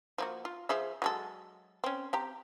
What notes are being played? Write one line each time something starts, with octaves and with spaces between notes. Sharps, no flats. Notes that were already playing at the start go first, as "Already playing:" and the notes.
F3 A#3 F#4
F4
F3 G#4 E5
F#3 G#3 A4
C4 C#4
C4 G4 A#5